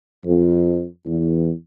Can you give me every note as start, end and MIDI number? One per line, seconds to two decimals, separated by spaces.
0.25 0.84 41
1.06 1.50 40